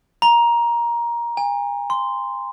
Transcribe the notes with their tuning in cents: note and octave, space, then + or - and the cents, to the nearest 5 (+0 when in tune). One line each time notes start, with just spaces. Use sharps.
A#5 +15
G#5 -40
C6 -10